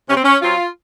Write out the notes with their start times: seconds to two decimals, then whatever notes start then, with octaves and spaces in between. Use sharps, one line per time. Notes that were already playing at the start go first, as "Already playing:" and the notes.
0.09 C3 C#4
0.17 C4
0.24 C#4
0.42 F#3 C4 F4